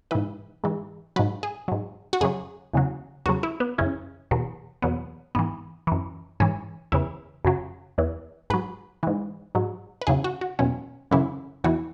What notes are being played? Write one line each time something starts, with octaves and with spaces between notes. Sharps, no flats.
G#2 E3 B4
G#2 E3
G#2 F#3 B4
G#4
G#2 F#3
F#4
F#2 C#3 F#3 G#4
E2 C#3 F#3
E2 C#3 F#3 F#4
E4
B3
F#2 C#3 E3 C#4
E2 B2 F#3
E2 B2 F#3 B3
G#2 E3 B3
F#2 E3
G#2 E3 C#4
E2 C#3 E3 E4
F#2 C#3 F#3
E2 E3
G#2 F#3 B4
G#2 E3
G#2 F#3
B4
E2 C#3 F#3 G#4
F#4
F#4
E2 B2 F#3 C#4
F#2 C#3 E3 E4
E2 E3 F#4